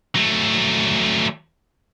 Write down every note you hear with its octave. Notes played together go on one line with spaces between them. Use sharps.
F#3 A3